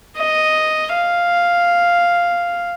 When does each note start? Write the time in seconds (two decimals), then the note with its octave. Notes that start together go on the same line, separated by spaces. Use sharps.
0.17 D#5
0.93 F5